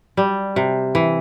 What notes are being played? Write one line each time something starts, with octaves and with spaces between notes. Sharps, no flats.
G3
C3
E3